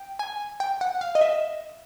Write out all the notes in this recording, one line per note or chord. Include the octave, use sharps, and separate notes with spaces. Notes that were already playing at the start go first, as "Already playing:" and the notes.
Already playing: G5
G#5
G5
F#5
F5
D#5
E5